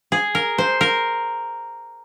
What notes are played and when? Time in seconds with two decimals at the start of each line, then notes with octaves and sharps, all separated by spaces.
0.12 G#4
0.35 A#4
0.58 C5
0.81 A#4